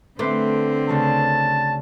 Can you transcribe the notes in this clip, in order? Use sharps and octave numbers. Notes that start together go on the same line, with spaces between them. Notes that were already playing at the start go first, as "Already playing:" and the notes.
D3 A3 C4 B4 C5 D6
D2 C#3 A5